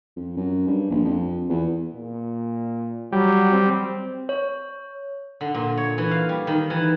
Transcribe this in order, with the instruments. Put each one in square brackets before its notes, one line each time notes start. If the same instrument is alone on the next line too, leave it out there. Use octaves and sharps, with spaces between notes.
[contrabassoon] F2
F#2
G2
A#1
F2
E2
[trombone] A#2
[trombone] F#3 [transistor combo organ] G3
[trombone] C4
[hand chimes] C#5
[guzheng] D3
A#2
C#5
E3
F5
G3
D#3
E3